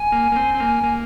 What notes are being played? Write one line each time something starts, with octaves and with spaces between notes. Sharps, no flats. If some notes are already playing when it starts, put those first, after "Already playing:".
Already playing: G#5
A#3
A#3
C4
C4
A#3
A#3